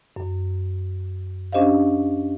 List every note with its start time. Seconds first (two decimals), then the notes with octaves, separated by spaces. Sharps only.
0.16 F#2
1.52 C#4 D4 G4 C5 D#5 F5